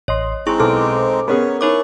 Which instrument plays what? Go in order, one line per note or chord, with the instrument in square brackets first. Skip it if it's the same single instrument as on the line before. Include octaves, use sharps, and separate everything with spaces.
[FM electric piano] A1 D#5 C6 [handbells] C#5
[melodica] G#3 C4 D#4 [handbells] E4 G#4 C#6 [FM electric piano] G#5
[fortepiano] B1 [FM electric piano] A4 C5 D6 [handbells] F6
[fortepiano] B3 C#4 G#4 [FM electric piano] A#4 [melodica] C#5
[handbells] D#4 C#5 D6 [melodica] E4 C#6